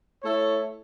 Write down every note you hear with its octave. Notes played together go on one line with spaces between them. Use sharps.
A3 E4 A4 C#5 E5